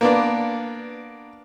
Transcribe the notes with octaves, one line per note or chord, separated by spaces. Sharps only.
A#3 B3 D4